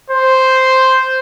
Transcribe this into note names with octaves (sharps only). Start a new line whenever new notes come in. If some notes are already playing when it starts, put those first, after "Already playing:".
C5